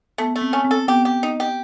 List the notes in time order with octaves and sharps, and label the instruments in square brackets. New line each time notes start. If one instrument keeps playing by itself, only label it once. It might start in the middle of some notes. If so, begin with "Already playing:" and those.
[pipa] A3 [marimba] B3
[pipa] A3
[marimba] C4
[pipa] C#4
[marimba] C4
[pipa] A4
[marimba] B3 [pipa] G4
[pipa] G4
D#4
G4